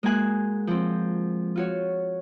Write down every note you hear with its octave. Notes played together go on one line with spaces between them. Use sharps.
G#3 A#3 F#4 G#5 F#6
F3 C4
F4 F#4 C#5